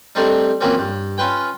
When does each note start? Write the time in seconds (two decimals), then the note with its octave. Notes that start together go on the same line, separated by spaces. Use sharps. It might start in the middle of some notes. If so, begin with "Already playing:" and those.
0.15 G3 A3 C4 D4 D#4
0.61 A#2 E3 F#3 A#3 C4 C#4
0.78 G2
1.18 C#4 F4 B4 G5